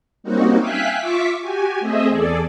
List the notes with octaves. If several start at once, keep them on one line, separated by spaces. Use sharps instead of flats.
G3 A#3 C4 C#4 D#4 F#4
E5 F5 G5 G#5 F#6 B6
F4 E5 C#6 D6 B6
F#4 G4 G#5
A3 C4 G#4 D#5 E5
E2 G#4 A4 D5